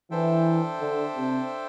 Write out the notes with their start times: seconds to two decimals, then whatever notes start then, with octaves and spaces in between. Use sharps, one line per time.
0.11 E3 D4 A4 C5 E5 G5
0.80 D3
1.15 C3